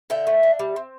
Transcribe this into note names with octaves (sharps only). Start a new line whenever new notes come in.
D3 E5 G5
A3
D4
G3
C4